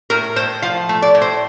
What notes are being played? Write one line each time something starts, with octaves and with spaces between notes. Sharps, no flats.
A2 A#4
A2 C5
F3 F5
A3
D5
A2
C5